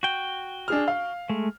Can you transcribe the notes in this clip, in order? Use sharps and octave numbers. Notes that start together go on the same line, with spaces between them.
F#4 G5
D4 G#4 F6
F5
G#3 A3